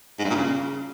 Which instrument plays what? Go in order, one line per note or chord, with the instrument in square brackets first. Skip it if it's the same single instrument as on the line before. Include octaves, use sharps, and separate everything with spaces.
[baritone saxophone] G#2
G2
A#2
C#3